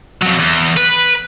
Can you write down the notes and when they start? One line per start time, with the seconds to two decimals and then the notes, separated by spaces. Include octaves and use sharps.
0.22 F2 F#3
0.39 E2
0.77 B4